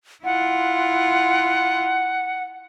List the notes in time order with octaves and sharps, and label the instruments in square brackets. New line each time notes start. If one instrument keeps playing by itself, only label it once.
[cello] E4 F4 [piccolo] F#5